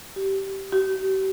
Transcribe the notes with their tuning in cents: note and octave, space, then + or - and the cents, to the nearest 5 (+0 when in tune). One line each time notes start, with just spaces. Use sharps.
G4 -20
G4 -45